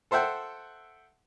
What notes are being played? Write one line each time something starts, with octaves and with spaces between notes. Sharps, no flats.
A4 C5 E5 F#5 G5